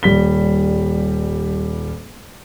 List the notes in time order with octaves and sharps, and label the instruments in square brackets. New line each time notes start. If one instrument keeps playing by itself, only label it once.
[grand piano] D#1 G3 B6 G7